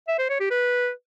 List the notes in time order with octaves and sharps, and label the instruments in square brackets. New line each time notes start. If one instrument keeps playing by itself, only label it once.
[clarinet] E5
C5
C#5
G4
B4